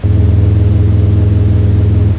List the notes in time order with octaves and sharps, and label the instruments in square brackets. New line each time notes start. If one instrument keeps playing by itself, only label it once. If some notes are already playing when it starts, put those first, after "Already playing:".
[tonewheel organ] E2 G#2